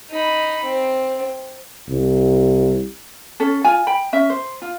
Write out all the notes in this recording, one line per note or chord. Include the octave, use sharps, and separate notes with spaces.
D#4 B5
C4
C2
C#4 A4
F4 G#5
G5 B5
C#4 E5
C5
F4